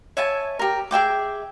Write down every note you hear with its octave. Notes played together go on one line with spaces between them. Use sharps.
C#5 E5 G#5 A5
G4 A#4
G#4 E5 G5 D6